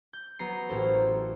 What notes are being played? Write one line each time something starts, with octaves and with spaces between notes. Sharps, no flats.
G6
F#3 B3 A#5 C7
A1 A#3 A4 C5